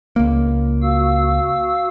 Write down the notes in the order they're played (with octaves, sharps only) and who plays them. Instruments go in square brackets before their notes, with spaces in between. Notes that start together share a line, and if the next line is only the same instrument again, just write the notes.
[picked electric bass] C#2 A#3
[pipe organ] F#4 F5 E6